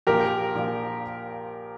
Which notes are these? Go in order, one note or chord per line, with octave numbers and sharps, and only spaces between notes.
A#1 A#2 F3 G4 A#4
A#1 A#2 F3